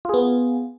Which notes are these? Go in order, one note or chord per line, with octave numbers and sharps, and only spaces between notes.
B3 F4 G#4